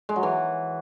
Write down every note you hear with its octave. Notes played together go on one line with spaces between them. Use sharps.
G#3
F#3
E3